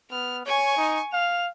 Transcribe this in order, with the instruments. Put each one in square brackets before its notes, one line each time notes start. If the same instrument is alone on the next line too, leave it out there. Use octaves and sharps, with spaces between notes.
[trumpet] B3 [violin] F6
[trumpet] C#5 [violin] G#5 C#6
[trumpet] D#4
[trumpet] F5 [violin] F7